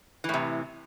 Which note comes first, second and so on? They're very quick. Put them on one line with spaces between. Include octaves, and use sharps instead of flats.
E3 A2 C3